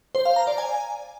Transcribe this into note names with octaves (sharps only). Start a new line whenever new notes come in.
C5
F5
A#5
D5
G#5